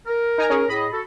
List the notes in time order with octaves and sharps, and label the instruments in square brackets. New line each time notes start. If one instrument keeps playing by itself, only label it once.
[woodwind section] A#4
[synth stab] D#4 G#5 A#5
C#4 G#4
[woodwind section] A2 G#4 D#5 [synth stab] B5
[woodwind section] F#4 A4